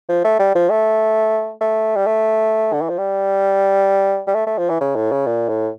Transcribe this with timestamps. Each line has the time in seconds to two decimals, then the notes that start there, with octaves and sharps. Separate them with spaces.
0.09 F3
0.25 A3
0.40 G3
0.55 F3
0.70 A3
1.61 A3
1.96 G3
2.07 A3
2.73 D3
2.82 E3
2.90 F3
2.98 G3
4.27 G3
4.35 A3
4.47 A3
4.58 F3
4.70 E3
4.81 C#3
4.96 A2
5.12 C#3
5.27 A#2
5.49 A2